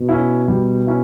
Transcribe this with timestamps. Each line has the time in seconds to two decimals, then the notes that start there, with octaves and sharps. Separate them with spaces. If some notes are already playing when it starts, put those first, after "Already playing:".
Already playing: B2
0.09 C#4 E4
0.48 G3
0.87 C#4 E4